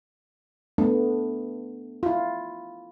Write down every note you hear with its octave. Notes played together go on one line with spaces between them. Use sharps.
A3 B3 D4
E4 F4